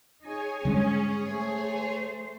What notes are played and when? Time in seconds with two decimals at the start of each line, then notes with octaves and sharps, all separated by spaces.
0.22 D#4 G#4 C#5 G#5
0.65 G#2 D3 G3 G#3 C#4
1.26 A3 C5